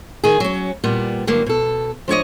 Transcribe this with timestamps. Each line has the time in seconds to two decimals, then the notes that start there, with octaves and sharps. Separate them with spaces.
0.24 D#3 G#4
0.40 F#3 C#4
0.84 A#2 G3 B3
1.27 G2 D3 F#3 A#3
1.46 B2 A4
2.08 F3 D4 C#5 D#5